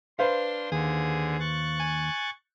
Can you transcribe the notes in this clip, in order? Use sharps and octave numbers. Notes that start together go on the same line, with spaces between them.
D4 B4 C5 F5 C6
D#2 D3 G#4
C#6 F#6 A6
G#5